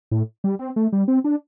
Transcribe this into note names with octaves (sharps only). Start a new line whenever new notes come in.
A2
G3
C4
A3
G3
C4
D4